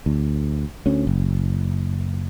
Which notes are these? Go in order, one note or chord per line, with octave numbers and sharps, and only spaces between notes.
D2
D2 C#4
F#1